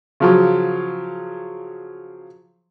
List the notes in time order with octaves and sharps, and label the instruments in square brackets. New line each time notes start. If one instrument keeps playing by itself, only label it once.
[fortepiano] C#3 F3 F#3